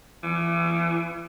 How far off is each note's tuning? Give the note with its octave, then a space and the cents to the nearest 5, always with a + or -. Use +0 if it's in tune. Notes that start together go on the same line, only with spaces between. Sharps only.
E3 +40